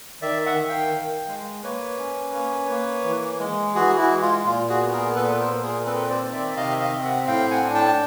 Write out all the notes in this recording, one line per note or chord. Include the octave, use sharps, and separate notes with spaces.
D#3 D5 E5
E5 F#5
D#3
F5 G5
D#3
G#3
A#3 B4 C#5
C#4
A#3
A#3
E3
G#3
E3 F#4 G#4
E4 F#4
G#3
F4
A#2 F4
F#4 G#4
B3
G#4 A#4
A#2 A4 B4
A#4 C5
A#2
G#4 A#4
C4 A4 B4
C5 D5
D#3
D5 E5
C3 D#5 F5
E5
D#5 F5
C4
E5 F#5
A2 F5 G5
F#5 G#5
D4
G5 A5